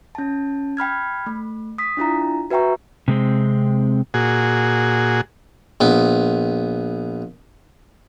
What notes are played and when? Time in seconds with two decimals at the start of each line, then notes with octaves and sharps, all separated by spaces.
0.15 C#4 A5
0.77 G5 B5 F6 G#6
1.26 A3
1.78 D#6 B6
1.97 D4 E4 F4 A#5
2.50 F#4 B4 E5 G5 A#5 C#6
3.08 C3 G#3 C4
4.14 A#2 F#4 G#4
5.81 A#1 B3